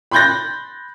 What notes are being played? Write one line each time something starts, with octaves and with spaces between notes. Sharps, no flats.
B5 C6 F#6 G6 A6 A#6